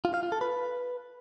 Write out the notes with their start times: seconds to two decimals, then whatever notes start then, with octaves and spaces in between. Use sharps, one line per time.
0.05 F4
0.14 F5
0.23 F4
0.32 A4
0.41 B4